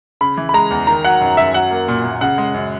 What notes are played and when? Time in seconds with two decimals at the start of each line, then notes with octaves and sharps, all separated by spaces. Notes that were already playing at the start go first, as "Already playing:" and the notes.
0.21 C#3 B5
0.37 E3
0.49 B5
0.54 G#3 A#5
0.71 E2
0.87 D#3 A#5
1.04 F#3 F#5
1.21 F#2
1.37 F#2 E5
1.54 F#3 F#5
1.71 A#3
1.88 A#2
2.04 A#2
2.21 C#3 F#5
2.38 G#3
2.54 F#2